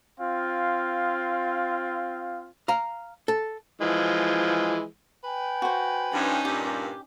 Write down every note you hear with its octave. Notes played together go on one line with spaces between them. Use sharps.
C4 F4 F5
F5 A#5
A4
E3 F3 G#3
B4 G5 G#5
F#4 C5
G2 F3 C#4 D#4
G2 A#2 G4